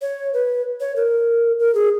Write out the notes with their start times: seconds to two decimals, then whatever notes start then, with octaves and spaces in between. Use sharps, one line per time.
0.02 C#5
0.33 B4
0.80 C#5
0.96 A#4
1.59 A#4
1.75 G#4